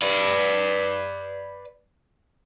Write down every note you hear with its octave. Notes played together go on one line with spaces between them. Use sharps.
B4 D5